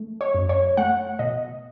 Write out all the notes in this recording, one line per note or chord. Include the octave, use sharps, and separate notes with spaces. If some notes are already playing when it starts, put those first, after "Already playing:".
Already playing: A3
C#5
F#2
C#5
A3 F#5
B2 D#5